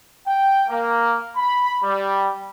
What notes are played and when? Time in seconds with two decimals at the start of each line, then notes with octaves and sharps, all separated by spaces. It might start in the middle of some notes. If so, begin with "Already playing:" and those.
0.27 G5
0.68 A#3
1.36 B5
1.82 G3